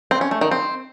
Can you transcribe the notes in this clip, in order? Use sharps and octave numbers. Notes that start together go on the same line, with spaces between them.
C4
C#4
A3
D#3
C4